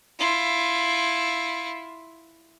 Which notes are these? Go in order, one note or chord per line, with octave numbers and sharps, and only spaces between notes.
E4 F4